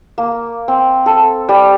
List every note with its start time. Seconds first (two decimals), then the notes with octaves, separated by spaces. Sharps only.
0.18 A#3
0.68 C4
1.06 A4
1.49 G3